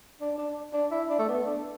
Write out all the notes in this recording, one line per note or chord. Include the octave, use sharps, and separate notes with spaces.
D4
D4
D4
E4
D4
A3
B3
D4